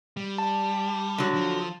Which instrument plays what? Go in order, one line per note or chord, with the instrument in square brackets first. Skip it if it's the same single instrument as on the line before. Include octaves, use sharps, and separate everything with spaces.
[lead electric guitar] G3
[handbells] A5
[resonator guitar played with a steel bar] D3 F#3
[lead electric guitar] F3